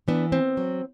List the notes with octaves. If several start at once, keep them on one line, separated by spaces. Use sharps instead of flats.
E3 B3 D4
B3 C4
F#3